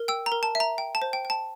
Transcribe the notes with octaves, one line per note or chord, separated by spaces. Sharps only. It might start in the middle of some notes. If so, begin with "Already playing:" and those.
Already playing: A#4
G5 E6
A#5
A#4
A5
E5
A#5
G5
A5
C5
G5
G5
A5